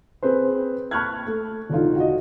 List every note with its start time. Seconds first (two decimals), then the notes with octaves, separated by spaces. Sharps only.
0.23 C4 G#4 B4 C5
0.91 A5 B5 C#6 F6 F#6 G#6
1.27 A3
1.69 E1 D3 D#4 F4
1.96 F#4 D#5